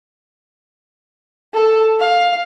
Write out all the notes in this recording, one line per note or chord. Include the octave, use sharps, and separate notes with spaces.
A4
F5